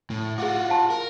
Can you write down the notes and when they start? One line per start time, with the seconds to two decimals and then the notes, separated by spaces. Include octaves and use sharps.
0.10 A2
0.38 F4 F#4 G#4 D6
0.69 F5 A5 C6
0.90 A#4